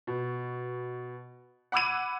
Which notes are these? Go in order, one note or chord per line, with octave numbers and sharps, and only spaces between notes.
B2
F#5 B5 D6 E6 G#6 D#7